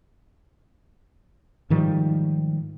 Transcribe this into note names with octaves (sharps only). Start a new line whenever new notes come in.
G#2 D#3 F3 G3